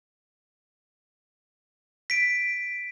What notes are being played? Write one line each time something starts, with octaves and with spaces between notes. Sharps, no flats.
B6 D7